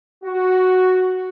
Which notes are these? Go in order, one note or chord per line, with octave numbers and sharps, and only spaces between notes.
F#4